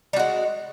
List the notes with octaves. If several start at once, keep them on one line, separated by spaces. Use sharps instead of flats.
G3 G#3 F#4